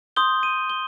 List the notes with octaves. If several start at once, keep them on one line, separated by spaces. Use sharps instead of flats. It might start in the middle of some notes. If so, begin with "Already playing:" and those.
C6 D#6 G6 G7
D#7
G7